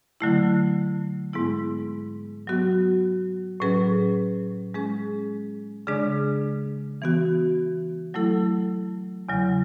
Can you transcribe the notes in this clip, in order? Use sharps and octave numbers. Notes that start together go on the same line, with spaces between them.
D3 F#3 A3 E4
G#2 G#3 B3 E4
F#3 B3 F#4
A2 F#3 C#4 G#4 B4
G#3 C#4 G#4
C#3 G#3 D4 G#4 D5
E3 B3 F#4
F#3 A3 E4 A4
E2 C#3 F#3